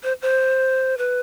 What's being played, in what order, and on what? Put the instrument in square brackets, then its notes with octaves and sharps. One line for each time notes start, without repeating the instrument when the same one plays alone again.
[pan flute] C5
C5
B4